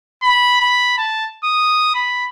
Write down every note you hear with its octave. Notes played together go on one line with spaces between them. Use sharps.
B5
B5
A5
D#6
B5